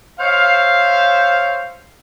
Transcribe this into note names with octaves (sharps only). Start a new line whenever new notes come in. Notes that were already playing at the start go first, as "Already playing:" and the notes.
C5 C#5 E5 F5